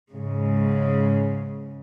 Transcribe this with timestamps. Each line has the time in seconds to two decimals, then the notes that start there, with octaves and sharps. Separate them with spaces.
0.10 G#2 C#3